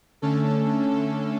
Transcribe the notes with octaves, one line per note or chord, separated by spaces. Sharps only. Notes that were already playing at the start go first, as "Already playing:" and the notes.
D3 A3 C#4 A4
A4